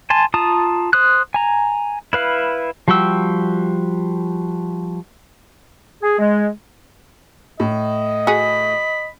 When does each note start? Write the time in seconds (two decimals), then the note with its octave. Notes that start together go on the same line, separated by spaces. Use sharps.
0.10 G#5 A5 C6
0.34 F4 A5 A#5 D#6
0.93 C5 D#6 F#6
1.34 G#5 A#5
2.13 E4 B4 F5
2.88 F3 G3 F#4 G5 E6
6.02 G#4
6.19 G#3
7.60 A2 D#5
8.27 F#4 G#4 B5